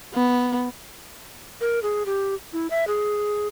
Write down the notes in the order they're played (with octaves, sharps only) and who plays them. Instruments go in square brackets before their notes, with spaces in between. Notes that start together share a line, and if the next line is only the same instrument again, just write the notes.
[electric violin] B3
[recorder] A#4
G#4
G4
E4
E5
G#4